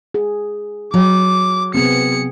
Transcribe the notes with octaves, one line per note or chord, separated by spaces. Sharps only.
G#4
F#3 D6
C3 B3 C4 G#4 C#7